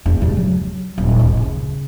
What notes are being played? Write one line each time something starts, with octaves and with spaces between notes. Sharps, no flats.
E2 D4
C#3 G3
F#3
D#1
A1 D2
C#3